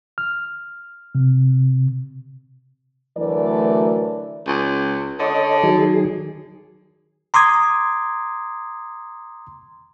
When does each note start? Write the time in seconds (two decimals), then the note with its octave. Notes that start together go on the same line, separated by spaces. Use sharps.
0.18 F6
1.15 C3
3.18 D2 E3 F#3 A3 A#4 D5
4.47 C#2
5.20 D3 A4 C#5 D#5
5.63 D#3 F#3 G#4
7.34 A#5 C6 D6 D#6 G#6